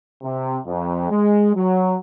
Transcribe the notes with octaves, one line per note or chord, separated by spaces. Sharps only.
C3
F2
G#3
F#3